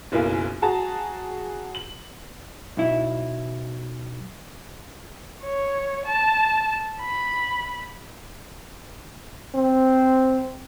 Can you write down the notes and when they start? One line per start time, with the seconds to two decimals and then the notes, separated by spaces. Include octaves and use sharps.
0.12 F#1 B1 A#3 E4 F4 G#5
0.62 F#4 G#4 A5 A#5
1.75 F#7
2.77 B1 E4
5.44 C#5
6.06 A5
7.01 B5
9.55 C4